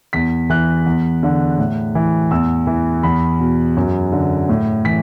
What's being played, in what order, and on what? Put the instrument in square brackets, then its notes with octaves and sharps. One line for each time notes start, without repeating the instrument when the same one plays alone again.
[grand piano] E2 B6
E3 F#6
E2
D3
A2
E3
E2 E6
E3
E2 B5
B2
F#2
D3
A2
E3 B6